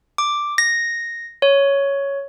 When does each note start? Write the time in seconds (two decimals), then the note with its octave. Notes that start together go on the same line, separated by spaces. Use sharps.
0.18 D6
0.58 A#6
1.42 C#5